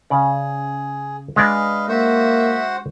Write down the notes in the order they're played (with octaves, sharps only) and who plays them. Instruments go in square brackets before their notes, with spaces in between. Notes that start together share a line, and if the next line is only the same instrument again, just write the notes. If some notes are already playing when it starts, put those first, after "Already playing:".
[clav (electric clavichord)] C#3 D5 [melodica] G#4
[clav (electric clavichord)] G#3 D4 D5 [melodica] B4 D#5 F5
[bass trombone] A#3 [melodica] F#4 C5 F#5 [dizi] E5